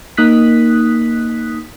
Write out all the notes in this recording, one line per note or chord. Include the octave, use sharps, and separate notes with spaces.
A#3 D#4 D#6 F#6 B6